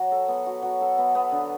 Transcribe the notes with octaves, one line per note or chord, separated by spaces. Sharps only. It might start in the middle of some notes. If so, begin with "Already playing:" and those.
Already playing: F#3 F#4
A4
B3
F#4
F#3
A4
B3
B3
D3